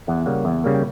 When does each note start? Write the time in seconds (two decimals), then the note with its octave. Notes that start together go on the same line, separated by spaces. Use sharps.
0.07 E2 F#5
0.26 C#3 G3 A#3 F#5
0.45 E2
0.64 C#3 G3 A#3
0.75 G5